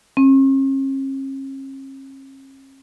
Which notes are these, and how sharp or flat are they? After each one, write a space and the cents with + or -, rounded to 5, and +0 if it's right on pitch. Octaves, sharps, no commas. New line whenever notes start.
C#4 -45